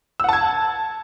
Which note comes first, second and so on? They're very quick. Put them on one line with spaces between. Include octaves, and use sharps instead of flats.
E6 F#5 A5 G#6